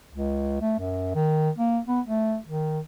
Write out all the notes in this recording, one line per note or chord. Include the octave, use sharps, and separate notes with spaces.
C#2
A3
F#2
D#3
A#3
B3
A3
D#3